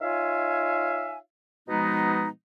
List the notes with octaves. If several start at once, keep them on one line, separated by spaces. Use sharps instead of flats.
D#4 F4 C#5 E5 F5 G#5
B2 F3 G#3 B3 D#4